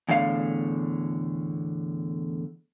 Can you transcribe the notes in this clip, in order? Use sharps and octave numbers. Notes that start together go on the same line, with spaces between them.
E2 A2 D3 F5